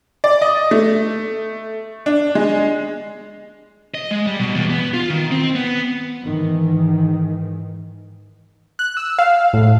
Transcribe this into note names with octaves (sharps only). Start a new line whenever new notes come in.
D5
D#5
A3
D4
G#3
D#5
G#3
G3
B2
E2
B3
F4
D#3
C4
B3
G#2 D#3 E3
F#6
E6
F5
A2